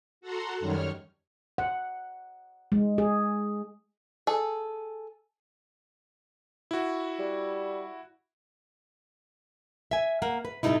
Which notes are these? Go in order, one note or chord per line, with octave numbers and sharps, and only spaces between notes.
F#4 A4 F#5 A#5 C6
F#2 D#3 G3 C#5 F6
F#5
G#3
G#4
G#4 A4
E4 F#4
G3
E5 G#5
A#3 F#5
B4
A2 C3 G3 A#3 D#4 E4